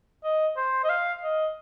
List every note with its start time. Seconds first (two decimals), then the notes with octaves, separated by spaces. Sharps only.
0.24 D#5
0.57 C5
0.84 D#5
0.90 F5
1.23 D#5